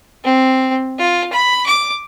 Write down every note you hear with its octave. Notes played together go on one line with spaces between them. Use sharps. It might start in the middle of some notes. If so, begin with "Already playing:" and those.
C4
F4
B5
D6